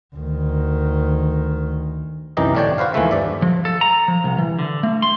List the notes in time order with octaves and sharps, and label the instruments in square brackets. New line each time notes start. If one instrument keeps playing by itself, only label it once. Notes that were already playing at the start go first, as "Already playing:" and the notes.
[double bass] D2 D#3
[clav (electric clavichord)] C2 F#2 E3 D#4 G4 D#5
A2 D3 D4 C#5 D5 G5
F#4 B4 C5 F5
D#2 E3 F3 G#3 A3 E5
G2 D5 E5
[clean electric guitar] F3
A4
A#5
F3
C2
E3
D3
A3
C6